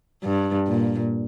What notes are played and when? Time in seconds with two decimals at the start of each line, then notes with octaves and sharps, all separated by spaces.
0.24 G2
0.68 A#2